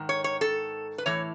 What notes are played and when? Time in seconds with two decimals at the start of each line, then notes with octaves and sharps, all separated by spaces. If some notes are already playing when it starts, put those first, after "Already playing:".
Already playing: G#2 D#3
0.09 C#5
0.24 C#5
0.41 A4
0.98 B4
1.06 A2 E3 C#5